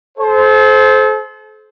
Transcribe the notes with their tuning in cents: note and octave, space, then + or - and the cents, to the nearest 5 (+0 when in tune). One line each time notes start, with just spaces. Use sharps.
A4 -40 C5 +0